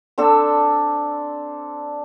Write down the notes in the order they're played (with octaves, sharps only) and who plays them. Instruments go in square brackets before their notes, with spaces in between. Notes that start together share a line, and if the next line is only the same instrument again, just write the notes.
[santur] C4 D4 A4 E6